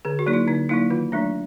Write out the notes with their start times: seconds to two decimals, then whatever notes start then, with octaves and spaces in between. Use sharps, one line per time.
0.05 D3 G#4
0.19 F#4
0.26 F#3 A#3 D#4
0.33 E4
0.48 D3 D#4
0.69 F#3 A#3 D#4 E4
0.90 D#3 F4
1.12 F#3 A3 D4